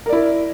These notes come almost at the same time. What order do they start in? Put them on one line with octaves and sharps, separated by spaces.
A#4 D5 E4